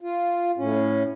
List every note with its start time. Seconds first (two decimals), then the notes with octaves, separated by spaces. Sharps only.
0.01 F4
0.58 A2 C#4